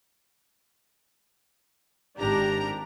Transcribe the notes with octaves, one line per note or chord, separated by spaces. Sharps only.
G#1 D4 G4 A#4 A#5